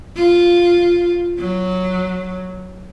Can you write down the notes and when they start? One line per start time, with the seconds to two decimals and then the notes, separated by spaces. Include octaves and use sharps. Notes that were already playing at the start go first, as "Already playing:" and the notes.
0.16 F4
1.39 F#3